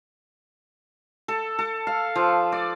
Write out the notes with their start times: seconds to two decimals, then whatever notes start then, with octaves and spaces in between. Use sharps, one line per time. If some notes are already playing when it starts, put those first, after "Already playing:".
1.28 A4
1.59 A4
1.87 F5
2.15 F3
2.52 D5